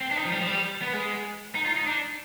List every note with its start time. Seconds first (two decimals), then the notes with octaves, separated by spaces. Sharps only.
0.01 C4
0.11 D4
0.16 D#4
0.25 F3
0.32 G3
0.41 F3
0.47 G3
0.82 B3
0.93 G#3
1.55 D#4
1.65 F4
1.76 D#4
1.86 D4